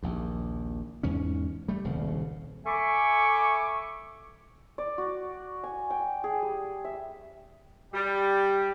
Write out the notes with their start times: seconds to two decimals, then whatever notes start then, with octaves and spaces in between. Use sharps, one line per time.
0.03 A#1 D#2
1.03 E2 G#2 C#4
1.68 G3 A3
1.84 D#1 C2 C#3
2.66 A4 E5 G#5 B5 C#6 D6
4.78 D5
4.98 F#4
5.63 G#5
5.90 G5
6.24 G#4
6.42 G3
6.85 E5
7.93 G3